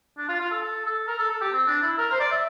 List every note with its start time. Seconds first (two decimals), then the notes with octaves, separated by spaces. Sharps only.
0.18 D4
0.29 F4
0.40 F4
0.51 A4
0.63 A4
0.85 A4
1.08 A#4
1.18 A4
1.31 A4
1.41 G4
1.52 C4
1.67 D4
1.83 E4
1.98 A#4
2.12 C5
2.20 D5
2.31 E5